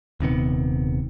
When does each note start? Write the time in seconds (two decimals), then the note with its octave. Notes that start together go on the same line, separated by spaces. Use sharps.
0.20 D#1 C3 D#3 B3